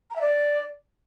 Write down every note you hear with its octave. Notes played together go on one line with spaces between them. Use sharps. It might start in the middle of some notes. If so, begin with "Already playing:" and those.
A#5
E5
D5